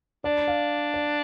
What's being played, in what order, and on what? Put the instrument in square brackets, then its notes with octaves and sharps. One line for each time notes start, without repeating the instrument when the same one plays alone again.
[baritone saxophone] D4 [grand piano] D5
[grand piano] F5
D5